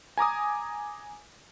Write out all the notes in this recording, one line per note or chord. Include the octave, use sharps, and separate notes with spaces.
G#5 A#5 D6 D#6